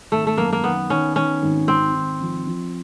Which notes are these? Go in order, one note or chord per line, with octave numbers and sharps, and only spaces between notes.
G#1 A3
A3
F#2 A#3
A#3
D#3 B3
D#3 C#4
D#3 C#4
G#1
G#1 C4
G#1
F3
F3